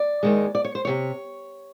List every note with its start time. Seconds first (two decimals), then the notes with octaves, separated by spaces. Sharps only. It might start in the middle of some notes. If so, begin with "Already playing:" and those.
Already playing: D5
0.23 D#2 D#3 G#3
0.55 D5
0.64 C#5
0.75 C5
0.85 C3 E3 C#5